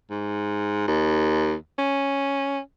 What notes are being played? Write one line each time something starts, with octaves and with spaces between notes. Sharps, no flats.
G#2
D#2
C#4